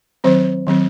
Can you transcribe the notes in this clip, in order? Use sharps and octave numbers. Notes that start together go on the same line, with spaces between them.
D#3 F#3 C4 C5
D#3 F#3 C4